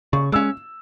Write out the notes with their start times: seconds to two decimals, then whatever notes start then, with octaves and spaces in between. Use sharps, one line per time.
0.13 C#3 C#6
0.32 G#3 C#4 E6